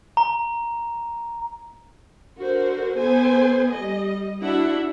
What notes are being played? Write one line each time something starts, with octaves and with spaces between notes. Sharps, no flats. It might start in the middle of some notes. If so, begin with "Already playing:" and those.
A#5
D3 F#4 A#4 C5
B3 A4 C5 G#5
G3 D#5
D4 E4 F#4 E5 F#5